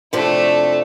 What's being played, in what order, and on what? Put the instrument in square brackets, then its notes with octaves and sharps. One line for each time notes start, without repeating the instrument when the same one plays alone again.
[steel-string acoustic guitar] F2 C3 D4 [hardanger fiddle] A3 E4